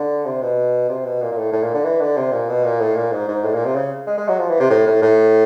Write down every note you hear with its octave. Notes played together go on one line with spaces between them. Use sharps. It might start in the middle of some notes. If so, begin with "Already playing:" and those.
Already playing: D3
C3
B2
C3
B2
A#2
A#2
A2
A2
A#2
D3
E3
D3
C3
A#2
B2
A#2
A2
A#2
G#2
G#2
A2
A#2
C3
C#3
G#3
G#3
F#3
F3
E3
C3
A2
A2
A2